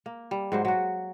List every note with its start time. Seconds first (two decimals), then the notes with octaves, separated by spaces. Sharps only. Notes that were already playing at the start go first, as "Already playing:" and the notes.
0.06 A#3
0.31 G3
0.52 G#2 F#3 C5
0.65 F#3 F#4